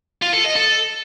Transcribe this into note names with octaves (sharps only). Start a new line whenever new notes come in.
F4
A4
D#5
A4